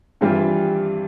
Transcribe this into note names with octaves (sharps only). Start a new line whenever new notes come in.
G2 E3 G3 C4 F4